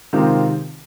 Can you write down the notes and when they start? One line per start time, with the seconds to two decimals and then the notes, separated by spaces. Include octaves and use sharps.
0.13 C3 D#3 G#3 C4 F4